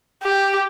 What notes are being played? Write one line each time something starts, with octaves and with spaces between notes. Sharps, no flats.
G4